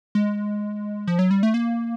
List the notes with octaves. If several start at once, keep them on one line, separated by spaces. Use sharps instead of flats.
G#3
F3
F#3
G3
A3
A#3